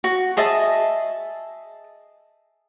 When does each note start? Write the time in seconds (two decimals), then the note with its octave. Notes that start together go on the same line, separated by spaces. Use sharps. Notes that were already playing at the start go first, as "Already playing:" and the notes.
0.04 F#4
0.37 G#4 D#5 E5 A5